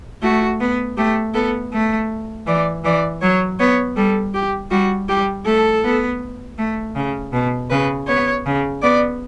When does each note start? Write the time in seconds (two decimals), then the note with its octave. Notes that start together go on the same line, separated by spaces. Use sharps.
0.22 A3 F#4
0.60 B3
0.97 A3 G4
1.34 B3 A4
1.73 A3
2.46 E3 D5
2.84 E3 D5
3.21 F#3 C#5
3.59 B3 C#5
3.96 G3 A4
4.34 G4
4.71 G3 F#4
5.08 G3 G4
5.46 A3 A4
5.84 B3
6.58 A3
6.95 C#3
7.33 B2
7.70 C#3 B4
8.08 B3 C#5
8.46 C#3
8.82 B3 D5